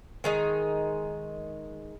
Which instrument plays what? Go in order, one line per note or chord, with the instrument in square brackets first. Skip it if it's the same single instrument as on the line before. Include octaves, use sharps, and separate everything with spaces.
[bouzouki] D#3 G#3 D#4